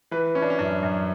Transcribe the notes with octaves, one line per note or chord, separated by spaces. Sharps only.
E3 B4
E3 C#4
D4
C#4
F#2 D4
F#2